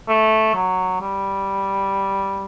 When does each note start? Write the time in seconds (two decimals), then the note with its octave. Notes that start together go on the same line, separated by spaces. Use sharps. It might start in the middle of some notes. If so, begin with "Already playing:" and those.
0.08 A3
0.55 F#3
1.01 G3